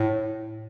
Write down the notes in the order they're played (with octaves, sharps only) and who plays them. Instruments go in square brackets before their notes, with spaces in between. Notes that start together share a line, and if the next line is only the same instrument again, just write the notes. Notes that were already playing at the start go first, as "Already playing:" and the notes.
Already playing: [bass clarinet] A2